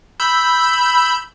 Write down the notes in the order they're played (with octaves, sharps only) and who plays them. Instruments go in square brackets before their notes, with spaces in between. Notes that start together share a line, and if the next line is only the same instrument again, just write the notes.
[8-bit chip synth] B5 E6 G6